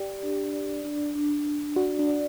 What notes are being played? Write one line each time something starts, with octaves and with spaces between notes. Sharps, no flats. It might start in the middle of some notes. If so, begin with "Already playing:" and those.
Already playing: G4 D5
D4
D5
D4
D4
D4
F#4 D5
D4
D5